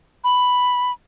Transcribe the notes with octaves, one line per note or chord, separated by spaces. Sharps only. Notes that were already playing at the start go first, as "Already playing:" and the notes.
B5